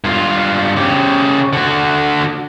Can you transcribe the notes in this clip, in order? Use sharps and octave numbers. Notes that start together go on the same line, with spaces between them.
G2 F4
C#3 G4
D3 F#4